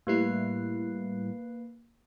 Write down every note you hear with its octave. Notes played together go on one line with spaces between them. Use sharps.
A2 G3 A#3 E4 B4 C7